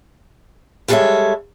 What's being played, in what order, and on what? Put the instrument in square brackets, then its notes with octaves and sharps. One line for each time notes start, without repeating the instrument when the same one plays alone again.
[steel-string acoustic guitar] G3 G#3 A4 A#4 C#5 E5